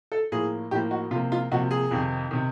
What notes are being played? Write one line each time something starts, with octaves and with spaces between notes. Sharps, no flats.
A4
A2 F3 A#3 G#4
A2 F3 A#3 G4
F#4
C3 F3 A#3 F4
F4
C3 F3 A#3 F#4
G#4
F2 C3 D#3
C3 D#3